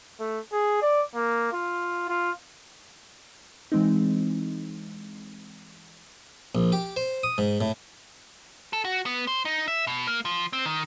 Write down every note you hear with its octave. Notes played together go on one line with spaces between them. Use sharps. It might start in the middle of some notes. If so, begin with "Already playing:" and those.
A3
G#4
D5
A#3
F4
F4
E3 G#3 C4 D#4
A#1
G4
C5
D#6
G#2
A2
A4
F#4
B3
C5
D#4
E5
B2
A#3
F3
C4
D#3